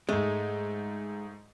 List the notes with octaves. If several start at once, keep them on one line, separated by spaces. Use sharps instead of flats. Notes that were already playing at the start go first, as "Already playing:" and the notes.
G#2 G#3 A3